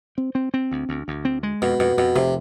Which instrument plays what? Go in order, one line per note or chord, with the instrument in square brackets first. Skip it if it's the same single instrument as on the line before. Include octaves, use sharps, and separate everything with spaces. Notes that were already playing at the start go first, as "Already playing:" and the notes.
[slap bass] C4
C4
C4
D2
D2
D2
C4
G#3
[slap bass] F2 [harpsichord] B2
[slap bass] F2 [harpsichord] B2
[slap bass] F2 [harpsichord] B2
[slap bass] F1 [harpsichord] C3